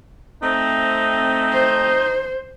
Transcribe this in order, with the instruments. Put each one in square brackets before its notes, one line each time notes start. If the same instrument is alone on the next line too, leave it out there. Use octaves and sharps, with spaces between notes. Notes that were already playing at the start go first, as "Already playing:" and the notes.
[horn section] A3 C4 [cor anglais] D#4
[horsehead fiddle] C5